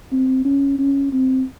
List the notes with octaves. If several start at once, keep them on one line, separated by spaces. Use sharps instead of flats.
C4
C#4
C#4
C4